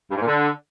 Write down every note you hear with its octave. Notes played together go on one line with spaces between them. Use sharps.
G2
G#2
A#2
D3